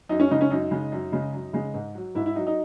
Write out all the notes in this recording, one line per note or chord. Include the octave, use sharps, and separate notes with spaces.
F#2 D#4
C#4
C#3 G#3 D#4
C#4
F#2 D#4
C#3 G#3
F#2
C#3 G#3
F#2
C#3 G#3
G#2
F#3
G#2 E4
E4
F#3 D#4
D#4